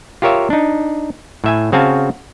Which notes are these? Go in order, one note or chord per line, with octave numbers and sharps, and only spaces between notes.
F4 G4 A#4 C#5 E5 F5
D4 D#4
A2 E5 G#5
C#3 C4 F#4 F5 G#5 A5